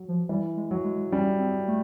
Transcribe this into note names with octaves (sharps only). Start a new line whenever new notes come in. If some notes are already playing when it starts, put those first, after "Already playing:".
Already playing: F#3
F3
E3 G3
G#3
F#3
G#3
G3 C#4
C4
A3